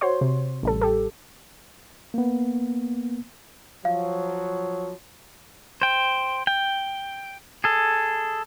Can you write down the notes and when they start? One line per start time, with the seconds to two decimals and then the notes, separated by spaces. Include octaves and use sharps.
0.01 F#4 C5 C#5 C6
0.21 C3
0.63 A1 G3 A4
0.81 G4 A4
2.14 A#3 B3
3.85 F3 F#3 F5
5.82 C5 G5
6.47 G5
7.64 G#4 A4